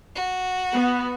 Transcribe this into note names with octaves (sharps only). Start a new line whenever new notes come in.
F#4
B3